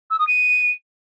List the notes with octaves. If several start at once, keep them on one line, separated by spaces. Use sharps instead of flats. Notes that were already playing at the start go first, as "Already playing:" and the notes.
E6
D#6
D#7